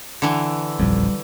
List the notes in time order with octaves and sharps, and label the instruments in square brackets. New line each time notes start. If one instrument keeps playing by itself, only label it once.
[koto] D3 E3
[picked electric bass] D#1 A#1 F2 [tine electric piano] G3